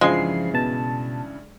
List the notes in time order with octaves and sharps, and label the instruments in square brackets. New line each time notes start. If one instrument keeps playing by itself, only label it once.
[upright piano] G2 C#3 E3 [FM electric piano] F3 C7 [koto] G#3
[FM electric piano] B2 A5